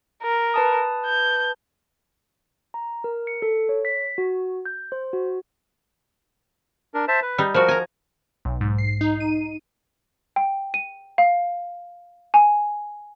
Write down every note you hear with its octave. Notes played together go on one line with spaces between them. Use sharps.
A#4
B4 A5 D#6
G6
A#5
A#4
C#7
A4
C#5
B6
F#4
G6
C5
F#4
D4 A#4
C5 E5 A5
B4
G3 D#4
F3 F#4 A#4
G#5 A#5
B1
G#2
C7
D#4
D#7
G5
D#7
F5
G#5